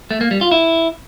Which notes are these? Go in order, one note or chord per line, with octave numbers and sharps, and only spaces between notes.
A3
A#3
G3
F4
E4